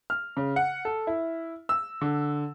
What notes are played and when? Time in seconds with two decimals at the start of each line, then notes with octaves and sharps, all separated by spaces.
0.10 F6
0.37 C#3
0.56 F#5
0.85 A4
1.07 E4
1.69 E6
2.01 D3